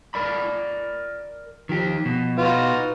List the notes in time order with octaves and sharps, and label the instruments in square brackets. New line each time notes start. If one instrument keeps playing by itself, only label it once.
[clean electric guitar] A#4 D5 B5
[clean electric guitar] D#3 G4 [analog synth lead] F3
[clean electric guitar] B2
[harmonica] D#4 F4 F#4 [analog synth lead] B4